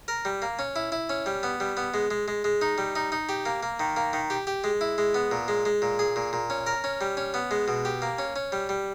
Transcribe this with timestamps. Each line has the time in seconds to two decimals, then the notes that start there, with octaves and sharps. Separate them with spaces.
0.08 A#4
0.25 G3
0.42 A#3
0.59 C#4
0.76 E4
0.92 E4
1.10 C#4
1.26 G3
1.43 B3
1.60 G3
1.77 B3
1.94 G#3
2.11 G#3
2.28 G#3
2.44 G#3
2.61 D#4
2.78 G3
2.96 D#4
3.12 D#4
3.29 G4
3.46 A#3
3.63 A#3
3.80 D#3
3.96 A#3
4.13 D#3
4.30 G4
4.47 G4
4.64 G#3
4.81 E4
4.98 G#3
5.14 B3
5.31 A#2
5.48 G#3
5.65 G#3
5.82 A#2
5.99 G#4
6.16 A#2
6.33 A#2
6.50 C#4
6.67 A#4
6.84 C#4
7.01 G3
7.17 C#4
7.34 B3
7.51 G#3
7.68 B2
7.85 G4
8.02 A#3
8.19 C#4
8.36 C#4
8.52 G3
8.69 G3